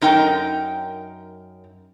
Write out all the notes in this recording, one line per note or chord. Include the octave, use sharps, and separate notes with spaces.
F#2 D#4 A#4 G5